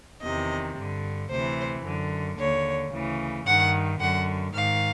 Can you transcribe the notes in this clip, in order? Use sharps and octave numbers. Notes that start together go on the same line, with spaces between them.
E2 C3 D#3 D#5
G2 D3
D2 C3 E3 C5
F#2 D3
D#2 D3 C#5
D2 C#3 E3
G2 D#3 F#5
F#2 D3 F#5
G#2 D#3 F5